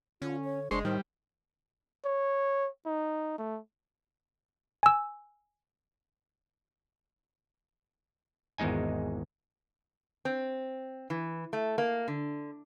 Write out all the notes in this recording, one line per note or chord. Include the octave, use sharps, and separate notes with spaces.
D3 C#4 F4
C#5
F#1 G#3 D4 C5 C6 C#6
A2 D#3 G3 C5
C#5
D#4
A3
G#5 E6
G#1 E2 G#3 D#4 G#5
C4
E3
A3
A#3
D3